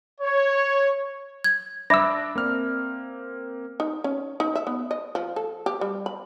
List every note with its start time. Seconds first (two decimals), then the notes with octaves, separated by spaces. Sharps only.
0.21 C#5
1.44 G#6
1.90 D4 D5 E5 B5 D6 E6 A#6
2.36 A#3 C4 F6
3.80 D#4
4.04 C#4
4.40 D#4
4.55 E5
4.67 B3
4.91 D#5
5.15 F3
5.36 A4
5.66 G4
5.81 G3
6.06 B5